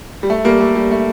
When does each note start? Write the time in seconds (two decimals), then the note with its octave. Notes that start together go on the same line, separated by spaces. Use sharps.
0.23 G3
0.30 A3
0.45 G3 A#3
0.61 A3
0.76 G3
0.91 A3